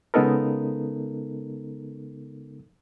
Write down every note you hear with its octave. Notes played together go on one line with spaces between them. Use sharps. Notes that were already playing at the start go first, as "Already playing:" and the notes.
C#3 G#3 B3 D#4 A4 A#4